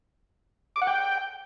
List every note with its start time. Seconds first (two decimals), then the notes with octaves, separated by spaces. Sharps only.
0.76 D6
0.82 F#5
0.87 G5